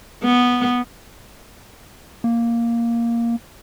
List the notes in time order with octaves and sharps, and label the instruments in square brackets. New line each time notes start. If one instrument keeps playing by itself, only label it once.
[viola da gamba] B3
[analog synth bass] A#3